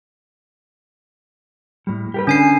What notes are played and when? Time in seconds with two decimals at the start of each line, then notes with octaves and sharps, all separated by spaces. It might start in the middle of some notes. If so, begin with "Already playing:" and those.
1.87 A2 G3
2.14 G4 A#4 B4
2.27 D3 C#4 G#5 C7